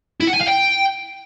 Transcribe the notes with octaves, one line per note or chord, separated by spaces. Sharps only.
E4
F#5
G#5
F5
G5